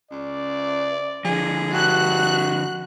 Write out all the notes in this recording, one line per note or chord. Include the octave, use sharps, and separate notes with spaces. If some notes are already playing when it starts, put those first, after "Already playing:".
C#2 D5
D3 F3 G#4
G2 F#4 F#6